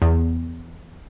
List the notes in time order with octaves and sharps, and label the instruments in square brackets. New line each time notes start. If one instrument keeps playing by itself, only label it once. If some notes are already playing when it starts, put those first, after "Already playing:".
[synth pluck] E2